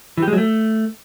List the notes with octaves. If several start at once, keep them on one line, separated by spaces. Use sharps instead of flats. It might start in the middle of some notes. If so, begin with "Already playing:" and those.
E3
G4
G#3
F#3
A3